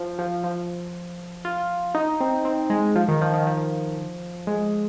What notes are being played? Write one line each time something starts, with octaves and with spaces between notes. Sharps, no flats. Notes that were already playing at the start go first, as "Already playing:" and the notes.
Already playing: F3
F3
F3
F4
D#4
C4
C4
G#3
F3
D#3
F3
D#3
F3
G#3